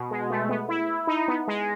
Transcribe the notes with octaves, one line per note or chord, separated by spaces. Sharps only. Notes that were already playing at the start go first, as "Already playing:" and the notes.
Already playing: B2
G#3
A3
B3
E4
D#4
B3
G#3